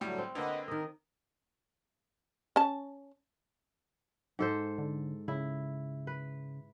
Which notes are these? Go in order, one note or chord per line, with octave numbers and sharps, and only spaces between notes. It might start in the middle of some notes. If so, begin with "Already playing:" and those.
A2 D3 F#3 G3
C4
D3 A#3 B4 D#5 F#5
D#3 A#4 D#5
C#4 A5
G#2 A4 C5
D3
C#3 E4
B4